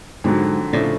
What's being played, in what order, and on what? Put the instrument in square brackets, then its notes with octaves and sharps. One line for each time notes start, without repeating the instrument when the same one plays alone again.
[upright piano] F2 D3 F#3 [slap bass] G#2
[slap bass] A2 [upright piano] C#3 F3 A3 D4